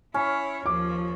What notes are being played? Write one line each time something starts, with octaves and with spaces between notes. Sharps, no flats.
C#4 E4 C#5 G#5
D#2 F3 D6